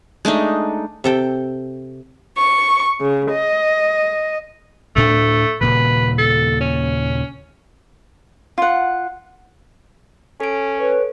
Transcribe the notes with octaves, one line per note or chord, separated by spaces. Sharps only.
G#3 A3 D4 D#4
C3 A4 G5
C#6
C#3
D#5
D2 A2 A3 D4
D#1 A#2 C#3 B4
A4
C#4
F4 F#5
C#4 A4 D7
B4 C#5